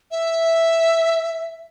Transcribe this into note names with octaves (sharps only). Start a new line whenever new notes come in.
E5